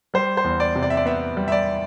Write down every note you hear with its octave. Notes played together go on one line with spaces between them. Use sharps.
G3 C5
C5
E2
D5
C3
D5
E5
D5
B3 E5
G3
E5
D5